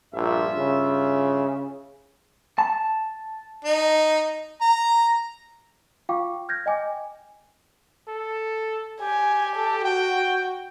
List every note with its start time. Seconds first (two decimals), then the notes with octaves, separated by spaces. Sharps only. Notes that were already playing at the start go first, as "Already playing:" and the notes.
0.14 A#1 G2 F4 E5
0.57 C#3
2.58 A5
3.64 D#4
4.61 A#5
6.09 F4 F5 G5 C#6 D6
6.49 F6 G6 G#6 A#6
6.66 D#5 G5 G#5 D6
8.08 A4
9.01 G4 G#5
9.56 A4
9.85 F#4 G5